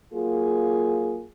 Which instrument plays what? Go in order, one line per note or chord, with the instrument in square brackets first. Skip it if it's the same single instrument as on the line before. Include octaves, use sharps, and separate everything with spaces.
[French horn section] F#3 A#3 F4 G#4